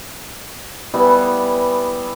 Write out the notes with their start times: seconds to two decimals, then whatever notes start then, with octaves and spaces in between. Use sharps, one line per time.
0.94 G3 B3 E4 G#4